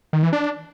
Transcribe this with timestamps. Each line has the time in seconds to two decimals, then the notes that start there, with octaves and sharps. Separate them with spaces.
0.13 D#3
0.23 E3
0.33 D4